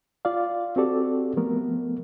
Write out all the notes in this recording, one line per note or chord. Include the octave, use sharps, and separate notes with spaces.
F4 D5 F5
C4 F#4 G4 A4 D5
F3 A3 B3 A#4